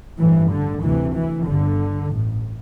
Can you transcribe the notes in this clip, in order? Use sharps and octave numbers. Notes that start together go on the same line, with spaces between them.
A1 G2 E3
D3
D2 C3 E3
E3
G1 G2 D3
A1 A2